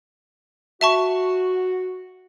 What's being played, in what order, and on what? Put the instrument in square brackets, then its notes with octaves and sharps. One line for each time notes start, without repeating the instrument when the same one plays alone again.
[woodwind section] F#4 [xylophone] E5 A5 C#6